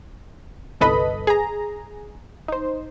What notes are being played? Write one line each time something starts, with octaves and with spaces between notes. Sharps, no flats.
G1 C2 A4 B4 D#5 B5
G#4 A#5
D#4 C5